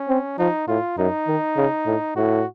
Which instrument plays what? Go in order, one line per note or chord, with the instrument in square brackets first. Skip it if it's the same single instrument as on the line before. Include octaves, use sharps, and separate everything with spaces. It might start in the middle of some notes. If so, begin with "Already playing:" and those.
Already playing: [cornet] C#4
[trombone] C4
[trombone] F3 [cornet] D#4
[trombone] A2 [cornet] F4
[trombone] F#2 [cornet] D#4
[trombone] D#3
C#3
A2
[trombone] A2 [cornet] F#4